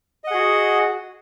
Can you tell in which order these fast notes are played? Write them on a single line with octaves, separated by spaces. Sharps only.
D#5 F#5 G#4 F#4